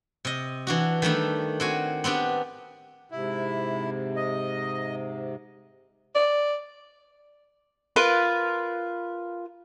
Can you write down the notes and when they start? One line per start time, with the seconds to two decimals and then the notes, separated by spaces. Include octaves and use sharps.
0.25 C3 D#5
0.67 E3 D4 F#4
1.02 D#3 G3 A3 D4
1.60 C4 F#4 G#5
2.04 B3 C4 D4 G4
3.12 G#2 C3 E4
4.16 D#5
6.15 D5
7.96 F4 A#4 B4 F5